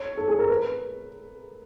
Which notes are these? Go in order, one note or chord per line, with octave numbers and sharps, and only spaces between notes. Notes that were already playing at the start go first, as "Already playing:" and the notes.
Already playing: C#5
A4
G#4
A#4
B4